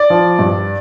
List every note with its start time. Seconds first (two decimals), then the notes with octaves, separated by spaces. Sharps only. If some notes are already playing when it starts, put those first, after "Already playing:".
Already playing: D5
0.10 F3
0.39 G2